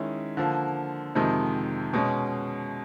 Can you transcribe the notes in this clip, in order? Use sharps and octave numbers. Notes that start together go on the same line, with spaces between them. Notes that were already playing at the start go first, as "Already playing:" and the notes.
Already playing: D#3 G#3 C#4 E4
D3 F3 A#3
F2 C3 D#3 G#3
B2 G#3 C#4